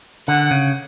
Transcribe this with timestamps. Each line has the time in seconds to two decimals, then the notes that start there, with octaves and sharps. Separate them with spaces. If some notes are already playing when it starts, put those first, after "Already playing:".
0.28 D3 F#5
0.51 C#3